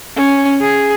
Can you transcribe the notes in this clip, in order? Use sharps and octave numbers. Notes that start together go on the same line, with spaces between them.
C#4
G#4